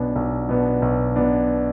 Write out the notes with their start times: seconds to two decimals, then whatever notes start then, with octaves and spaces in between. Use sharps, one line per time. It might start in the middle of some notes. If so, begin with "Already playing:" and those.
Already playing: B1 B2 B3 D4
0.16 B1
0.49 B2 B3 D4
0.82 B1
1.16 B2 B3 D4